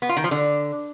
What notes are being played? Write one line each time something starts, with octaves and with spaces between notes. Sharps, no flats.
B3
F4
D#3
F3
D3